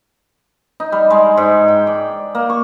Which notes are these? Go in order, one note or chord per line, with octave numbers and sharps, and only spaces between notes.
D#4
G3
G#3
G#2
G5
D5
A#3
C#6